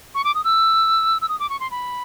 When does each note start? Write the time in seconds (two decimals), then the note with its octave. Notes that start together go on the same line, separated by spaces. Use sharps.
0.15 C#6
0.24 D6
0.35 D#6
0.44 E6
1.22 E6
1.29 D#6
1.40 D6
1.50 C#6
1.60 C6
1.71 B5